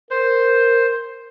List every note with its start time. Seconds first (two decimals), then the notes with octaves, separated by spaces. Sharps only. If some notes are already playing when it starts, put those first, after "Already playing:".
0.11 A#4 C5